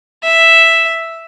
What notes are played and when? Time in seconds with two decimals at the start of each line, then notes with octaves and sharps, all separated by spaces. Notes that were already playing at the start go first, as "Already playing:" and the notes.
0.24 E5